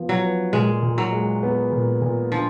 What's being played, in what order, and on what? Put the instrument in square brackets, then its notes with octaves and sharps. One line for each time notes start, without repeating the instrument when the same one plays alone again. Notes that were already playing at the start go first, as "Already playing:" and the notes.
Already playing: [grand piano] F3 B3 F4
[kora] F#3
[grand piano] B4
[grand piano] A#2 [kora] G#3
[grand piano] A#2
[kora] F#3
[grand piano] G#3
B3
A#2
A#2
[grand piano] D3 [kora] F3